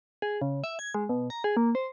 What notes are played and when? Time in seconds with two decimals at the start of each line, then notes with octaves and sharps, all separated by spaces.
0.22 G#4
0.42 C#3
0.64 E5
0.79 G#6
0.95 G#3
1.09 B2
1.30 A#5
1.44 G#4
1.57 A#3
1.75 C5